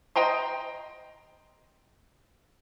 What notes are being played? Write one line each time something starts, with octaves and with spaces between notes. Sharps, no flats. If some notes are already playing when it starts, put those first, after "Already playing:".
D#5 G5 A#5 C6